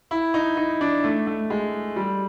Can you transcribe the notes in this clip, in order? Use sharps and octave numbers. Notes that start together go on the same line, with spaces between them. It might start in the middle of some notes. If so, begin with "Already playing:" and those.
E4
D#4
D#4
D4
A3
A3
G#3
G3